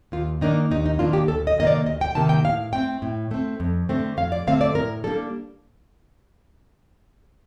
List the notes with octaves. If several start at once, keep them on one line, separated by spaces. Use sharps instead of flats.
D#2 F4
D#3 A#3 D4 D#4
D#2 D#4
D#4
D#3 A#3 D4 F4
G4
D2 A4
D#5
C3 D#3 A#3 D#5
D5
D2 D#5
G5
C3 D#3 A#3 A5
G5
A2 F5
A3 C4 G5
A2
A3 C4
F2
D3 A3 C4
F2 F5
D5
D3 A3 C4 F5
D5
A2 A#4
G3 A#3 D4 A4